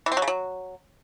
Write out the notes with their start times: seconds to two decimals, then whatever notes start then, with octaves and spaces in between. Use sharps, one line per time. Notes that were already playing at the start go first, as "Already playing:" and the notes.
0.06 E3
0.12 C4
0.17 F#3
0.22 C#3
0.28 F#3